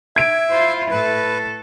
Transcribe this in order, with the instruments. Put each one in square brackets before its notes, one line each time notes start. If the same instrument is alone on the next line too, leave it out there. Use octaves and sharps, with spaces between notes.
[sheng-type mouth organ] E5 [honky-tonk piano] G#6 D7
[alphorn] E4 [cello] F4 C5
[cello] A2 A4 [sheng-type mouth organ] B4